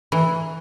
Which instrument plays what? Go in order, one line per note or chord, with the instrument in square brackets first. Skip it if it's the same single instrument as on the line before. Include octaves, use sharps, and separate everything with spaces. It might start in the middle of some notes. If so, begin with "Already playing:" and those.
[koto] E3